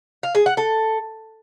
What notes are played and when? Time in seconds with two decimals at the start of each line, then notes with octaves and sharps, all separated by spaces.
0.23 F5
0.35 G#4
0.46 F#5
0.57 A4